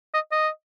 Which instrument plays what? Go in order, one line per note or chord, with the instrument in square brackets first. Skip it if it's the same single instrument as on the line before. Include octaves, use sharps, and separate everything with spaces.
[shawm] D#5
D#5